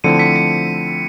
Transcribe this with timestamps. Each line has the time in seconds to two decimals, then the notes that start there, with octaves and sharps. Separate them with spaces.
0.04 D3 F3 A3 C4 E4 C#7 D#7
0.19 B6 C#7
0.36 B6 C#7